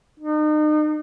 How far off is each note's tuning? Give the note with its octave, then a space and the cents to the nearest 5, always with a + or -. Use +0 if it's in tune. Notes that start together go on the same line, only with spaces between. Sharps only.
D#4 -35